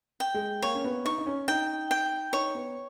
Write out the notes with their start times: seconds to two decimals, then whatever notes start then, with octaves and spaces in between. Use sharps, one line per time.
0.20 G5
0.34 G#3
0.62 A#3 C#5
0.75 C#4
0.84 B3
1.05 D#4 C#6
1.18 D#4
1.27 C#4
1.48 D#4 G5
1.91 G5
2.33 D#4 C#5
2.55 B3